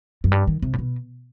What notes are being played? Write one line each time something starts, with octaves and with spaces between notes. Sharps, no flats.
F#2
G2
D#3
C3
A2
B2